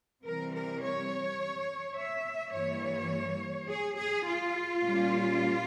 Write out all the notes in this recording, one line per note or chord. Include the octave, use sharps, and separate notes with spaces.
C3 E3 G3 C4 A#4
A#4
C#5
E5
G2 E3 G3 A#3 C#5
G#4
G#4
F4
A#2 G3 A#3 C#4